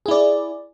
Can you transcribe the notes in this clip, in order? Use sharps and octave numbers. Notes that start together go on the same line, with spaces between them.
E4 G#4 D5